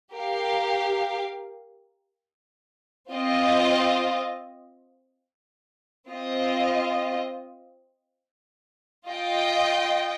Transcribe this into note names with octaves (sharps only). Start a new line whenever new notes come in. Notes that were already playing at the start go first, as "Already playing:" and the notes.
G4 A#4 F5
C4 F4 D#5
C4 F4 D#5
F4 D#5 G5